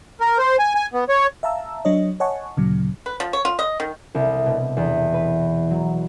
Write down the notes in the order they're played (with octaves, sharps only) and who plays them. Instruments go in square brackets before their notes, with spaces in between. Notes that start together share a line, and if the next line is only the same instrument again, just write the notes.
[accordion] A#4
C5
G#5
G#5
B3
C#5
[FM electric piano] E5 F5 A5 A#5 E6
F#3 D4 C#5 D#5
C#5 D#5 F#5 G#5 A5 C#6
D2 A#2 C#3 F#3
[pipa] B4
F3
C#5
F4
D#5
D#3
[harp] C2
B2
E2
B4
F#3